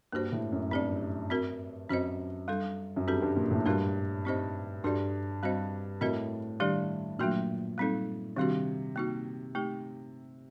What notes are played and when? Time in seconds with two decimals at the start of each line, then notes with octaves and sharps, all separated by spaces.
0.12 G2 A#3 F#4 C5
0.32 A2
0.52 F#2
0.71 G2 C4 G4 D5
1.30 C4 F#4 A#4
1.90 F#2 C4 F#4 C5 D#5
2.48 G3 D4 A4
2.96 F#2
3.07 G2 C4 F#4 A4
3.22 G2
3.37 A#2
3.51 A2
3.66 G2 G3 D4 F#4 A#4
4.25 C4 D#4 G4 C5 D#5
4.84 G2 D4 F#4 A4 D5
5.43 G3 C4 F#4 C5 D#5
6.01 A2 C4 F#4 A#4 D#5
6.60 D#3 G3 D4 G4 D5
7.19 A#2 F#3 A3 D4 F#4
7.78 G3 C4 D#4 A4
8.36 C3 D#3 G3 D4 F#4
8.96 A#3 D#4 F#4
9.55 A3 D#4 G4